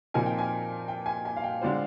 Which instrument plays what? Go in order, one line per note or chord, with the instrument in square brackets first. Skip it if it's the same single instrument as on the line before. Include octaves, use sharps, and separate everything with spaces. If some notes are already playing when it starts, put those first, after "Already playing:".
[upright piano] A#2 F3 C4 D#4 A#4 [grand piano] G#5
[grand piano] G5
G#5
G5
G#5
G#5
F5
G5
[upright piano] D3 G#3 D4 F4 C5